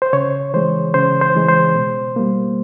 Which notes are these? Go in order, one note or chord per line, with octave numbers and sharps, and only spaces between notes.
C5
C#3 C#5
E3 G#3 C5
C#3 C5
C5
E3 G#3
C5
B2
G3 A#3